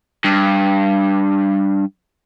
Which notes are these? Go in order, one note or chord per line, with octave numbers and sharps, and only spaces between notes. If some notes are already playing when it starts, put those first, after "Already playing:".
G2